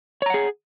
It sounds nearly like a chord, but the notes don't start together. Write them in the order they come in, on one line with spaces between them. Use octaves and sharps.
C#5 A#5 F#5 G#4